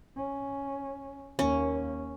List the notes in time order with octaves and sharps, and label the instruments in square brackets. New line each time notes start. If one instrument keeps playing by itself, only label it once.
[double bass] C#4
[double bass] D#2 A#3 [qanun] C#4